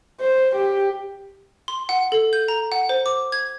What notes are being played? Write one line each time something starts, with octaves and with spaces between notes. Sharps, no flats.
C5
G4
C6
F#5
A4
G6
A#5
F#5
C5
D6
G#6